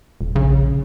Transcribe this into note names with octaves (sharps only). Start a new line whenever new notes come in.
D#1
A#1 C#3